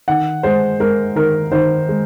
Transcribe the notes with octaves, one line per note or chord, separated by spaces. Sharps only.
D#3 F#5
G#3 C5
G#3 A#4
D#3 A#4
D#3 C5
G#3